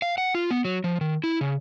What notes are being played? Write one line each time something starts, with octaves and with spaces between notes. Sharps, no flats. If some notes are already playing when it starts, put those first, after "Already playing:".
F5
F#5
F4
B3
F#3
F3
D#3
E4
C#3